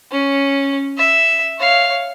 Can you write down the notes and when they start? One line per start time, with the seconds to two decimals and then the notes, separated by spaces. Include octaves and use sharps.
0.11 C#4
0.97 E5
1.59 C#5 F5